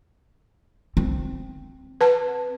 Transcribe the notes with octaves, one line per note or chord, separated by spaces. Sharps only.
C4
B4 A5